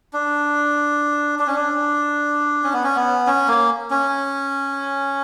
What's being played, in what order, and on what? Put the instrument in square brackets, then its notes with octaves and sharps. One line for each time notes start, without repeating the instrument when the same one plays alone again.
[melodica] D4
D4
C#4
D4
C#4
B3
C#4
B3
C#4
A#3
C#4